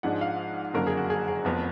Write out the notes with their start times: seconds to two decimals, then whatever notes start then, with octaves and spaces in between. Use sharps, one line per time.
0.03 G#2 F3 G#3 D4 F#5
0.21 F5
0.74 F#1 F2 D3 F#3 A#3 A#4
0.87 G#4
0.97 F#4
1.10 G#4
1.28 G#4
1.45 F1 F2 F3 B3